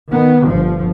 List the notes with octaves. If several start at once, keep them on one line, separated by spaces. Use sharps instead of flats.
D#3 B3
G1 F3